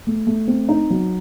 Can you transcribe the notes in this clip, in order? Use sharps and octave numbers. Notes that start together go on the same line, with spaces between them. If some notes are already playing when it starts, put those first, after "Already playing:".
A3
A3
C4
D#4
F#3